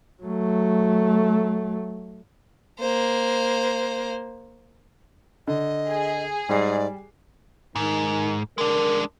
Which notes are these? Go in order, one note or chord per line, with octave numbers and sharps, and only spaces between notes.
F#3 A3
A#3 C5
D3 D#5
G#4
G#2 G3 D5 C7
G#2 D#3
G#3 D4 A#4